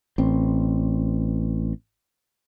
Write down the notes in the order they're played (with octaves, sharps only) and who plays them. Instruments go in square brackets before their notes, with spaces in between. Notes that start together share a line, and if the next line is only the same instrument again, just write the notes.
[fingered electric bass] A1 C4